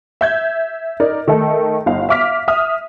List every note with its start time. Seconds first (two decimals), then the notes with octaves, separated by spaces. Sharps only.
0.21 E5 G6 G#6
1.00 D#4 A#4 D5
1.28 D#3 A3 A4
1.86 G1 D#4 F5
2.09 E5 F5 D6 F6 B6
2.48 E5 D#6 F6